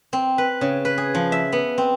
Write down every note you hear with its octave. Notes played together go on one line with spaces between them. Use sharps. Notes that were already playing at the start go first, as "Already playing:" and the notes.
C4
B4
C#3
B4
G#4
F3
E5
B3
C4